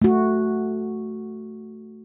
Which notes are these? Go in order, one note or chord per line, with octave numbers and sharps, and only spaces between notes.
A3 F#4